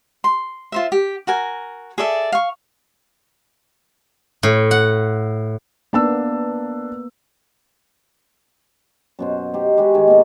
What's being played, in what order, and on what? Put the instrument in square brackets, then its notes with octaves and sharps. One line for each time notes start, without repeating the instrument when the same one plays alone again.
[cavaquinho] C6
F4 C5 E5
G4
F#4 A#4 G#5
G#4 A4 D5 E5
F5 C#6
[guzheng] A2
F#5
[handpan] A#3 B3 [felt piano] D4 A5 E6
[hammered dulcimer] F#2 B2 C5
D#4 G4 C5
G#3 F#4 G4 B4
D#3 G#3
B2 A#3